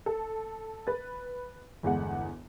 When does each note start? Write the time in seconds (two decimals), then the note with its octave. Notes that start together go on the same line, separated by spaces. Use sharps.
0.06 A4
0.87 B4 A6
1.83 G1 E2 G#3 F#5